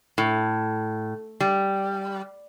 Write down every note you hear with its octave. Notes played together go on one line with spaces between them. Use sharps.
A2
G3